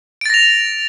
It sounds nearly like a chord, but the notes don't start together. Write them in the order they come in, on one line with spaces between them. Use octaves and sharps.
D7 A6 A#6 F7